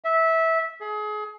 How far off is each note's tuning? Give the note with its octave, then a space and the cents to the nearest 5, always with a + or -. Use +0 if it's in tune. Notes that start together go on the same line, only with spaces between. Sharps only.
E5 -15
G#4 +30